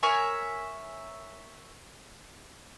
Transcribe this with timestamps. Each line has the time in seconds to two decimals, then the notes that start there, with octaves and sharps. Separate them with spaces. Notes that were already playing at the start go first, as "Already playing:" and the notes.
0.03 A#4 C#5 E5 G#5